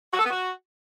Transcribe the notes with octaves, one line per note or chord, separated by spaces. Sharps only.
F#4
A4
B3
F#4